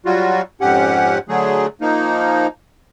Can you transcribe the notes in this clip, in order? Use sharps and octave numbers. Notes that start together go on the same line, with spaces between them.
F#3 G3 F4 F#4
F2 G#2 C#4 G4 F#5
D3 F#3 A3 G#4
F3 A#3 D#4